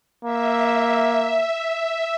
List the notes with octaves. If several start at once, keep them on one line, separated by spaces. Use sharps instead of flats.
A#3 E5